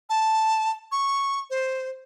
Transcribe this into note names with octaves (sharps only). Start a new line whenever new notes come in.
A5
C#6
C5